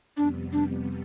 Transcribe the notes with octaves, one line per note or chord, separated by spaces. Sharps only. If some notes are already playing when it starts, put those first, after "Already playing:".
F2 C3 G3 B3 D4
D4